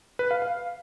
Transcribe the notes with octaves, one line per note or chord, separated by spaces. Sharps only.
B4
F5
F5